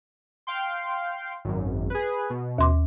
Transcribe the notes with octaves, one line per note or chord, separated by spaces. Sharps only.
F5 G5 C6
G#1 F#2
G#4 B4
B2
D#2 C6 D6